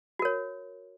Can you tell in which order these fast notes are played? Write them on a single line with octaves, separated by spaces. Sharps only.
F#4 A#4 C#5